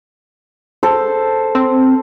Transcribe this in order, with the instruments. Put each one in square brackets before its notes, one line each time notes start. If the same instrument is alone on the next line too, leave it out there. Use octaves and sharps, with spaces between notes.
[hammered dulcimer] A4 C5
[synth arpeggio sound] C4